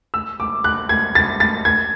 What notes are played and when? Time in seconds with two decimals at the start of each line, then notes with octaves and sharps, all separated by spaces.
0.14 E6
0.40 D6
0.64 F#6
0.89 G#6
1.15 A6
1.40 A6
1.65 G#6